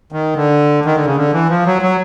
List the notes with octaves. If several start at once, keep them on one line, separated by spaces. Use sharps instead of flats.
D#3
D3
D#3
D3
C#3
D3
E3
F3
F#3
F#3